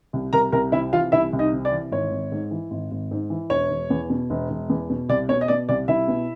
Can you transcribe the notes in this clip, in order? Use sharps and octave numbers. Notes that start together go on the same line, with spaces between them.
C2
C2 A#4 A#5
C2 A#4 A#5
C3 E4 E5
E3 F4 F5
C2 E4 E5
C2
D#4 D#5
C3
D5
E3
G#1 C#5
G#1
G#2
E3
G#1
G#1
G#2
E3
E1 C#5
E1
E2
B2
E1
E1
E2
B2
C2 D5
B2 C#5
D#5
B2 D5
C2 D5
C2 E4 E5
B2